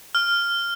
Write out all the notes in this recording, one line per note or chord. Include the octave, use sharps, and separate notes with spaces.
F6